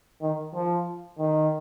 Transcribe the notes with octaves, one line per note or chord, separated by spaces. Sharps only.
D#3
F3
D#3